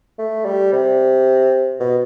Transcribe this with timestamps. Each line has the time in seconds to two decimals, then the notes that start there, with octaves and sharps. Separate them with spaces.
0.19 A3
0.45 G3
0.73 C3
1.80 B2